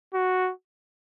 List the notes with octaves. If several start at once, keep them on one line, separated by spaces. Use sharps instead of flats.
F#4